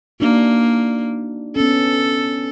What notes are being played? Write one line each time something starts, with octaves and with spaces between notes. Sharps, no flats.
A#3 D4 D#4 F#4
B3 C#4 A4